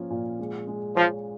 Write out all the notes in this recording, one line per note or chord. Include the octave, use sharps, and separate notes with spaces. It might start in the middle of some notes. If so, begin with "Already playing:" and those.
Already playing: F3 A#3 C#4
A#2
G#3
G#3
F3 C#5